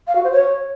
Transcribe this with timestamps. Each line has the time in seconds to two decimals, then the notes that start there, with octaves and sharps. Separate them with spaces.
0.07 F5
0.15 F#4
0.24 C5
0.32 C#5